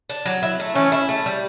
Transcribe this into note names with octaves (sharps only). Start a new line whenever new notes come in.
D4
F#3
E4
A3
E3 C#4
E4
A3
G3